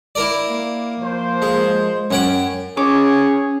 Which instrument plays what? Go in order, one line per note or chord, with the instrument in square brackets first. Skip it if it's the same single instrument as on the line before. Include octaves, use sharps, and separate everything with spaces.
[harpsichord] E4 A#4 D5
[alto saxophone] A#3
[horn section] F3 C5
[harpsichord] G#3
[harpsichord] F#2 F#5 G5 [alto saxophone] C#4
[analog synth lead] C#4 [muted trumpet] G#4 [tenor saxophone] C#5 [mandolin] D6